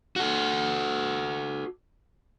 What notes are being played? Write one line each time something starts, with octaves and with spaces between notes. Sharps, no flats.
F#4 A4